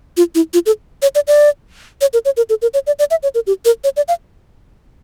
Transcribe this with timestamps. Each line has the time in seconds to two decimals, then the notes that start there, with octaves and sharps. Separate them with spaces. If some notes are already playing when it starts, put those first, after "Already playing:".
0.17 F4
0.35 E4
0.54 F4
0.66 A4
1.02 C#5
1.15 D5
1.27 D5
2.01 C#5
2.13 A#4
2.25 C#5
2.37 A#4
2.49 A4
2.62 A#4
2.74 C#5
2.87 D5
2.99 D5
3.11 E5
3.23 C#5
3.35 A#4
3.47 G4
3.65 A#4
3.84 C#5
3.97 D5
4.08 F5